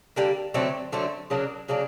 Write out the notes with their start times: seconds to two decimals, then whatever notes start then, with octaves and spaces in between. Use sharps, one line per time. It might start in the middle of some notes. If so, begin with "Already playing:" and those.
0.16 D3 G3 A#3
0.54 D3 F#3 A3 C4
0.92 D3 F#3 A3 C4
1.30 C#3 F#3 A#3 D4
1.68 C#3 F#3 A#3 D4